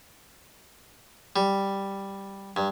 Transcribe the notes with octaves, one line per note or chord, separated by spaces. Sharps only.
G3
G2